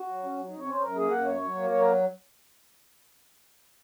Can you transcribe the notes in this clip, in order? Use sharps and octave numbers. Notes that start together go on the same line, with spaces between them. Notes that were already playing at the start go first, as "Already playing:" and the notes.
Already playing: F#4
F#3
C#4
F#3
C3 D#4
C#5
C#4 C5
F#2 A#4
A#3 G#4
F#2 F#5
F#3 C#5
F#3
A#3
F#3 C#5
A#4